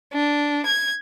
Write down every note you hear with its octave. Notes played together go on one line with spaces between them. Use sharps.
D4
G#6